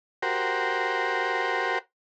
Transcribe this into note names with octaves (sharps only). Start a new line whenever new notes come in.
F#4 G4 A#4 C5